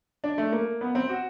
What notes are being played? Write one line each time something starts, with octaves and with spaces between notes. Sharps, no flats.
D4
A3
A#3
B3
C4
F#4